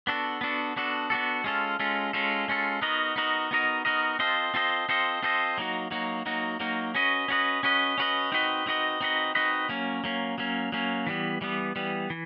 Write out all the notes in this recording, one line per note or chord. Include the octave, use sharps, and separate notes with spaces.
B3 D4 F#4 A4
B3 D4 F#4 A4
B3 D4 F#4 A4
B3 D4 F#4 A4
G#3 C#4 F4 A4
G#3 C#4 F4 A4
G#3 C#4 F4 A4
G#3 C#4 F4 A4
B3 D#4 F#4 A#4 D#5
B3 D#4 F#4 A#4 D#5
B3 D#4 F#4 A#4 D#5
B3 D#4 F#4 A#4 D#5
C4 F4 A4 C5 D#5
C4 F4 A4 C5 D#5
C4 F4 A4 C5 D#5
C4 F4 A4 C5 D#5
F#3 A#3 D#4 F#4
F#3 A#3 D#4 F#4
F#3 A#3 D#4 F#4
F#3 A#3 D#4 F#4
C#4 F#4 B4 D#5
C#4 F#4 B4 D#5
C#4 F#4 B4 D#5
C#4 F#4 B4 D#5
C4 D#4 F#4 B4 D#5
C4 D#4 F#4 B4 D#5
C4 D#4 F#4 B4 D#5
C4 D#4 F#4 B4 D#5
F#3 A#3 C#4
F#3 A#3 C#4
F#3 A#3 C#4
F#3 A#3 C#4
E3 G3 B3
E3 G3 B3
E3 G3 B3
E3